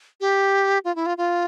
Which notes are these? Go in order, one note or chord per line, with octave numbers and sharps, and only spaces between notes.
G4
F4
E4
F4
F4